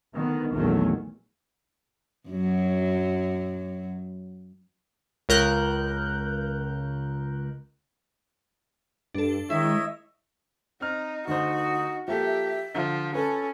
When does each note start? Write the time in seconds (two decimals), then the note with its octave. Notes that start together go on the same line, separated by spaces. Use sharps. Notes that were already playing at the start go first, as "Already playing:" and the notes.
0.14 D2 D#3 B3
0.52 A#1 E2 D#3 F#3 A3
2.29 F#2 F#3
5.29 C#2 A#4 F#6 G6
9.14 G2 D4 A4
9.50 D#3 G#3 E4 C#5 D#5 E5
10.81 C4 D#4 F6
11.27 D2 D#4 F#4 C5
12.08 F3 A#3 G4 A4 E5
12.75 D3 F3
13.15 C#4 A4 B4